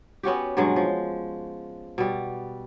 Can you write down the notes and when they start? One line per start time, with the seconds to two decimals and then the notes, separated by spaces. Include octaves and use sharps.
0.23 B3 C#4 F#4 G4
0.57 G2 B2 F#3 G#3
0.76 F3
1.98 B2 G3